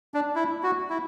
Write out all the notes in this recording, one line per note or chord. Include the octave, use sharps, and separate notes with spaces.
D4
E4
F#4
E4